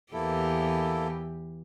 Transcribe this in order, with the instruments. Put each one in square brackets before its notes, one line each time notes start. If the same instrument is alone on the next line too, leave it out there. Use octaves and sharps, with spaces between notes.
[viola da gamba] E2 E3 G4 [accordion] A#3 E4 A4